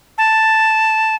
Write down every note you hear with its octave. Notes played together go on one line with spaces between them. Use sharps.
A5